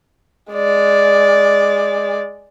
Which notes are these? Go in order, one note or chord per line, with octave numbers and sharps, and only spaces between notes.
G#3 D5